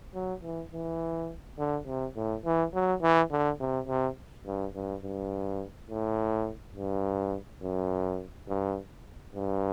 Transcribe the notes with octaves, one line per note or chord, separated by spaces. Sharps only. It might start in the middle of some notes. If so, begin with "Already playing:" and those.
F#3
E3
E3
D3
C3
A2
E3
F#3
E3
D3
C3
C3
G2
G2
G2
A2
G2
F#2
G2
G2